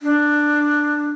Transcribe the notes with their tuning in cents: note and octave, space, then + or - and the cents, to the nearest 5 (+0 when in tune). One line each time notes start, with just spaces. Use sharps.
D4 +10